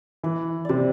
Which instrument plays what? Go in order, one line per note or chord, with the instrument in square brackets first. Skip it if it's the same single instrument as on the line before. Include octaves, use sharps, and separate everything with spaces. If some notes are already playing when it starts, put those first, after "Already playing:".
[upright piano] E3 [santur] B4
[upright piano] C3 [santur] C5 D5